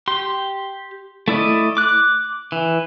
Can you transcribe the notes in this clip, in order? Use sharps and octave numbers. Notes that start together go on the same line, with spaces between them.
G4 C6
A3 E4 D5 D#5
D6 F#6
E3